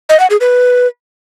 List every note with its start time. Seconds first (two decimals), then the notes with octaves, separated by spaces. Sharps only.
0.09 D#5
0.20 F#5
0.30 G#4
0.40 B4